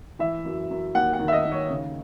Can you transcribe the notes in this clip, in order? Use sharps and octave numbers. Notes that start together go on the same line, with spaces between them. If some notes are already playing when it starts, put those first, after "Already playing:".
E3 E5
F#2
F#2
D#2 F#5
F#5
D#3
E5
D#5
D#3
C#5
C#3